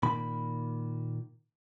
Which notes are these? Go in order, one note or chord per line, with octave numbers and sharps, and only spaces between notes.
A#2 D#3 A#3 B5